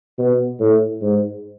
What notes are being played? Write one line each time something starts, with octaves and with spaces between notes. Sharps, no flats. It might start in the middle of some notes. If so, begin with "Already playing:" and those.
B2
A2
G#2